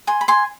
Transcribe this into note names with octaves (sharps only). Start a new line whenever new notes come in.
G#5 C6
B5
G#5 C6